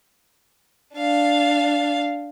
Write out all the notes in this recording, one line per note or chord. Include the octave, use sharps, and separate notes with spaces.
D4 F5